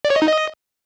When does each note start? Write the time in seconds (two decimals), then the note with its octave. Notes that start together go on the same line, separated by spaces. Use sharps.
0.05 D5
0.10 C#5
0.16 D#5
0.22 D#4
0.28 D#5